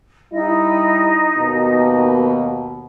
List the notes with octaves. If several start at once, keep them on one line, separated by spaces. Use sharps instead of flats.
G3 D#4 E4 D#5
D#2 B2